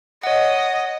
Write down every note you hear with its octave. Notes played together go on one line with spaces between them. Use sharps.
C#5 D#5 F#5